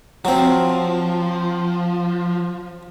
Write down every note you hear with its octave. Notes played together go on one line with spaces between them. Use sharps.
F3 F#3 C4